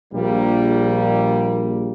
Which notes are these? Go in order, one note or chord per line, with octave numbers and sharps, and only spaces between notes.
A#1 G3 A#3